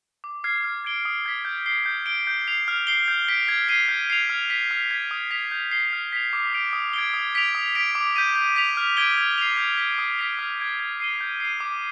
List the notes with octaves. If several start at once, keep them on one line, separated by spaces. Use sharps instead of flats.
D6
F6 G#6 C7
F6
G#6 D7 G7
D#6
G#6 B6
G6
C7 G7
G6
D7 G7
G6
C7 F7
F6
C7 G7
G6
B6 D7 G7
G#6
C7 D#7 G7
G6
C7 F7
F6
B6 F7
F6
G#6 B6
D#6
B6 F7
G6
C7 G7
F6
B6 F7
D6
G6 D7 F7
D#6
G#6 D7 G7
D#6
B6 D7 F7
D#6
B6 D7 F7
D6
G6 B6 D#7
G6
B6 F7
F6
G#6 D7 G7
G#6
C7 F7
G6
B6 F7
D#6
B6 D7 F7
F6
G#6 D7
G#6
C7 D#7 G7
G6
C7 D#7
D6